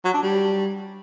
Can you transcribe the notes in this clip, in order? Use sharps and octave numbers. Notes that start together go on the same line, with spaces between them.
F#3
D4
G3